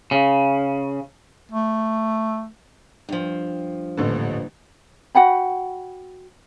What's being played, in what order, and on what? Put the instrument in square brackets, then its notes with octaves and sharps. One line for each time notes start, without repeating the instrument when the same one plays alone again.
[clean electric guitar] C#3
[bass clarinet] A3
[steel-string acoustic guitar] G2 F3
[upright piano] D#1 A1 D3
[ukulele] F#4 F#5 G5 B5